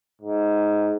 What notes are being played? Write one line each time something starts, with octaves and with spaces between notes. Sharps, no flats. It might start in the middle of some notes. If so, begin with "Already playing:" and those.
G#2